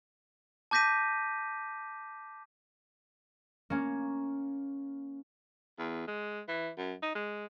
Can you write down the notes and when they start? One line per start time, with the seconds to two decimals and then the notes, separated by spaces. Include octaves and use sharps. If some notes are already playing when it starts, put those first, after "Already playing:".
0.71 A5 D6 G6 A#6 B6 D#7
3.70 A#3 C#4
5.79 E2
6.07 G#3
6.48 E3
6.78 F#2
7.02 D#4
7.15 G#3